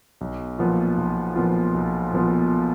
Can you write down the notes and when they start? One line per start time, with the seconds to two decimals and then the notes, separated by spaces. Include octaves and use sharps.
0.21 B1
0.59 A#2 F3 B3 F4
0.98 B1
1.36 A#2 F3 B3 F4
1.74 B1
2.13 A#2 F3 B3 F4